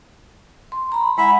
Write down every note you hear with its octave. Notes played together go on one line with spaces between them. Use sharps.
C6
A#5 B5
G#3 E4 F#5 B5